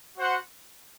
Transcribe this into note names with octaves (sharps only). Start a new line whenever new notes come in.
F#4 C5 F#5